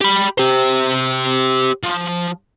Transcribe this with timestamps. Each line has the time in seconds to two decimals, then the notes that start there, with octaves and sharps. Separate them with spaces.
0.01 G4 B5
0.38 G4 C5
1.84 F3